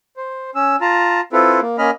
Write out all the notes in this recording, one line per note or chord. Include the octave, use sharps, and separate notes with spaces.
C5
C#4 E6
F4 A5 A#5
C4 E4 F4 A4 B4
A#3
A#3 C#4 D#5 B5 F6